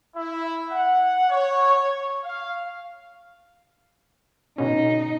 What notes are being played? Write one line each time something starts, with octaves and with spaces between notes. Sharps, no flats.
E4
F#5
C#5
F5
B2 D3 C#4 D#4